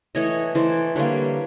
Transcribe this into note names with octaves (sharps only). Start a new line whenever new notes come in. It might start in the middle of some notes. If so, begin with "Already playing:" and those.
E3 A3 C#5 D#5
E3 A3 C5 D5
D3 G3 A#3 B4 C#5